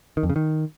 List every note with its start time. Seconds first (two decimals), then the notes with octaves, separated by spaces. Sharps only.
0.17 D#3
0.23 F2
0.30 C#3
0.36 D#3